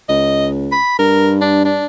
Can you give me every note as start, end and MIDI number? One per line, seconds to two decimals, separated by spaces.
0.09 0.78 37
0.09 0.47 75
0.72 0.98 83
0.99 1.84 43
0.99 1.33 70
1.41 1.61 62
1.65 1.86 62